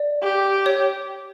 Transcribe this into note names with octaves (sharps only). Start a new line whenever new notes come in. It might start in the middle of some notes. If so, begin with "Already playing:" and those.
Already playing: D5
G4
C#5